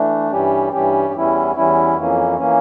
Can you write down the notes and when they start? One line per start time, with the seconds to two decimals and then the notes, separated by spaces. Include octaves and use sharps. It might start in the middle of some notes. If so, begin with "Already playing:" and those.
Already playing: E3 A3 D4
0.31 G2 E3 G3 C#4 G4
0.73 G2 E3 G3 C#4 G4
1.14 E2 E3 G3 C#4 E4
1.56 E2 E3 G3 C#4 E4
1.97 F2 E3 A#3 C#4
2.38 E3 A#3 C#4